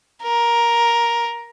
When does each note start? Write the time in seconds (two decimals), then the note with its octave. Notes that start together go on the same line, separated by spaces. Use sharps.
0.23 A#4